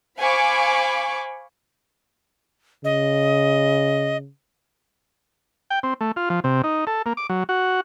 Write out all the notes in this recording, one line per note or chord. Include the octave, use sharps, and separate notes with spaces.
C5 F5 G#5 B5 C#6 D6
C#3 D#5
G5
C4
A3
F4
F3
C3
D#4
A4
A#3
D6
F#3
F#4